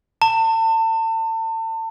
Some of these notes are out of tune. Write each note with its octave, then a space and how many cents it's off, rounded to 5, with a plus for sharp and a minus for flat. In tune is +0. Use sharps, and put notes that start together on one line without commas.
A5 +35